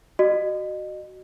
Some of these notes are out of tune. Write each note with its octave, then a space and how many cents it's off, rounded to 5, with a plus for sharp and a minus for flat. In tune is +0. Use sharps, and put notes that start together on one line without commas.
F#4 +10 D#5 -30